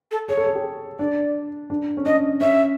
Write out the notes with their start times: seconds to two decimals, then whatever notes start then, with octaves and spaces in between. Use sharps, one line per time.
0.11 A4
0.28 G#4 C#5
0.37 A4
0.46 G#4
0.55 G4
0.99 D4 D5
1.70 D4
1.97 C#4
2.06 D4 D#5
2.41 C#4 E5